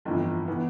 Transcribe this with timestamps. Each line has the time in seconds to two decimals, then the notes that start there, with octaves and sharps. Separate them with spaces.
0.05 G1 F2 E3
0.48 E3 B3